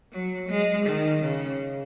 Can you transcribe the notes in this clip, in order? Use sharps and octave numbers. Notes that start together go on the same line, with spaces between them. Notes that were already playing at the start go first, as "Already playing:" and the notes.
F#3
G#3
D#3
C#3